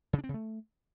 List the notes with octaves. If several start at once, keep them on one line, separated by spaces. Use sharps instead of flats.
C#3
D4
C4
C#3
A3